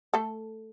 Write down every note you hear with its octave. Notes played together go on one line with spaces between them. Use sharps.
A3 A4